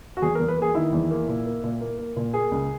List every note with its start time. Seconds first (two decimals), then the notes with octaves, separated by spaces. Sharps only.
0.17 F#4
0.22 E2 G#4
0.35 A#4
0.40 E2
0.48 B4
0.57 A#3 G#4
0.75 D#3 E4
0.92 E2
1.10 A#3
1.29 A#2
1.46 A#3
1.64 A#2
1.81 A#3
1.98 A#3
2.16 A#2
2.33 A#3 G#4
2.52 C#2